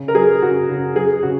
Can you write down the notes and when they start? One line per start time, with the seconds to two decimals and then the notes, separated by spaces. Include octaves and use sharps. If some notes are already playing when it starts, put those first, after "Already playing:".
Already playing: C#3
0.08 A#4
0.15 F#3 G#4
0.42 C#3 F#4
0.69 C#3
0.96 F#3 G#4
1.23 C#3 F#4